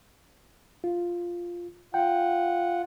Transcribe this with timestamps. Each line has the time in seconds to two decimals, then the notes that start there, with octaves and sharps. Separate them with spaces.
0.84 F4
1.94 F4 F#5 G5